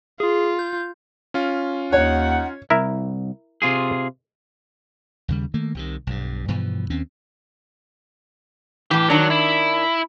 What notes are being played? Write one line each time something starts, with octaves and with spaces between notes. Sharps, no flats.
F4 G#4
G6
C#4 F4
D#2 D#4 C#5 F#5
C2 E4 A#4 E5
C3 F4 G#4
D#2 C#3 G3
D#3 A3 A#3
C2 C3 D#3
B1 G2
G2 B2 E3 F3
D#2 C4 C#4
A2 E3 G4
D#3 F#3 D4
E4